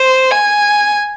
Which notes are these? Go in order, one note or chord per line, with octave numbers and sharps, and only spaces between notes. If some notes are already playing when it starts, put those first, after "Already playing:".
Already playing: C5
G#5